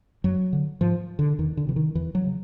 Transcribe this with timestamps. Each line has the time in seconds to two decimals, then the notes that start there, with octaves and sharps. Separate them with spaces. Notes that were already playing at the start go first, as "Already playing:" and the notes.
0.24 F#2 F#3
0.53 D3
0.81 G#2 F3
1.19 D3
1.38 E2 D#3
1.57 D3
1.67 C3 E3
1.76 D#3
1.95 E2 E3
2.15 F#3
2.24 C#3